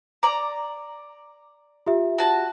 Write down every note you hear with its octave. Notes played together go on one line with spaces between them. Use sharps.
D5 A#5 D6
F4 G4 E5
F#4 A5